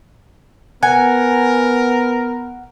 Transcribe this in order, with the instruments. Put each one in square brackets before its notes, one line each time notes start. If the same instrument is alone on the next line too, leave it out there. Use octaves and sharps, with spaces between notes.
[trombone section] B3 [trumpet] A#4 [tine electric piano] F#5 [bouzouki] G#5